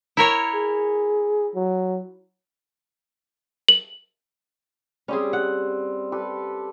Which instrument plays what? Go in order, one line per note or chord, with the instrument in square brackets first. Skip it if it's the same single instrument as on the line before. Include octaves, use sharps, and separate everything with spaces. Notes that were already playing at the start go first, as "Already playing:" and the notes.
[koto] E4 A#4 C#5
[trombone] G#4
F#3
[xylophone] F#7
[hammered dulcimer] G3 C4 [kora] C#4 G4 G#4
[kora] F#5
[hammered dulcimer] G4 A4 B4